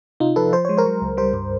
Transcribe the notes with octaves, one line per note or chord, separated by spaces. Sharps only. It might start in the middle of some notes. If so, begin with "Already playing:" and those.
C3 D#4 F4
F3 A4 B4
F3 C5
G#3 C#5
A#4 C5
F#3
C#2
G3 A#4 C5
G2